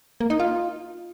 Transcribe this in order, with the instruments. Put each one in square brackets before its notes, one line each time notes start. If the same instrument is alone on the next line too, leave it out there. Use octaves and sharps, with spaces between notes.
[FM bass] A#3
D#4
F4